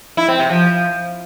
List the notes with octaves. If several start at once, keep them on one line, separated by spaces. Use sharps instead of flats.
E4
C4
C3
F3